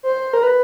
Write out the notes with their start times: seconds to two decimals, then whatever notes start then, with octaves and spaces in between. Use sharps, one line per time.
0.03 C5
0.33 A#4
0.43 B4